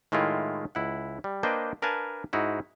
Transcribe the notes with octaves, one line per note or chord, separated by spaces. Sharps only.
A2 D#3 G#3 E4 F4
C#2 E4 F#5
G3
A#3 D4 B4 C5 D#5 G5
D4 A#4 B4 F5 G#5 A5
G#2 D#4 E4 F#4